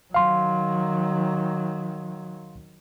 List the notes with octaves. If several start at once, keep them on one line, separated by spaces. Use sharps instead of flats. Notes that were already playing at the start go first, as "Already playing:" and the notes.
D#3 F#3 F5 C6